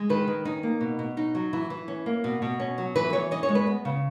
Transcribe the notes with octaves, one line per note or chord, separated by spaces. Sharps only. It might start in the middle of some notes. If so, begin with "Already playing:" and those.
Already playing: G#3
D#3 B4
D#3
C#4 D#4
A#3
B2
B2
C#4 D#4
F#3
E3 E4
E3
C#4
A#3
B2
B2
C#4
F#3
E3 B4
E3 C#5
C#4 D#5
C#5
G#3
B4
B3
C#3